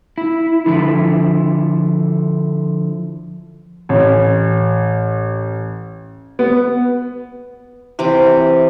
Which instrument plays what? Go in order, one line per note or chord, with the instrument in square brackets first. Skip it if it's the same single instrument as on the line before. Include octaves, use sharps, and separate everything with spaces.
[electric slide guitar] E4
D3 F3 E4
[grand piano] A1
B3
[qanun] C3 E3 D6